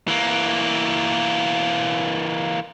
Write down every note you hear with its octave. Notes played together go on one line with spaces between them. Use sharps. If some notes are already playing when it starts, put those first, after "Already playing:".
E3 A#3